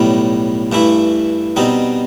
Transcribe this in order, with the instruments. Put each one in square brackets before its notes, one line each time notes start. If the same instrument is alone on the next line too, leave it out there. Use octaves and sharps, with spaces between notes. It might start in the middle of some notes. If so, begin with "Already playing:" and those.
Already playing: [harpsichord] B1 A2 G3
G2 E3 A3 E4
B2 G3 C4 D#4